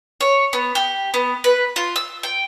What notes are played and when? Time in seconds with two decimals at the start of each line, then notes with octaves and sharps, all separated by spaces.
0.21 C#5
0.53 B3
0.75 G4
1.14 B3
1.44 B4
1.76 F4
1.96 E6
2.23 G5